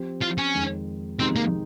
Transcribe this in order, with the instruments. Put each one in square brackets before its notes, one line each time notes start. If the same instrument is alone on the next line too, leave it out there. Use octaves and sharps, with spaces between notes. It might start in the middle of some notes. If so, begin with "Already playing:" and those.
Already playing: [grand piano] F3 C4 G4
[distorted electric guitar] F4
C#4
[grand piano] F2 D#3 G#3 D#4
[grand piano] C3 D#3 G#3 D#4 G4 [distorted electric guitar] C4
[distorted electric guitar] A#3